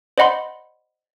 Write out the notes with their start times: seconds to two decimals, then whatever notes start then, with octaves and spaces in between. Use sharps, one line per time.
0.18 C5 D5 D#5 F#5 B5 C6